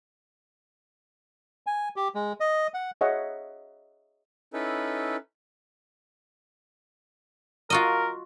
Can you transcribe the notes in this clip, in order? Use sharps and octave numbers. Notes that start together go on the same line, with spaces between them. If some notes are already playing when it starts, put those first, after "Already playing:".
G#5
G4
G#3
D#5
F#5
G#4 C#5 D#5 E5 F#5
C#4 D#4 E4 A4 B4
F4 F#4 A#4 D#5